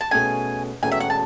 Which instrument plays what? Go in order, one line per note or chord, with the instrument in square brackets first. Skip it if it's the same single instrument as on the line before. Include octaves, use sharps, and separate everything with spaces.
[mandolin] A5
[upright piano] B2 A3 C#4 G#4 [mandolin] G#5
[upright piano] E1 E2 B2 A3 C#4 [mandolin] G#5
[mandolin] E5
F#5
A5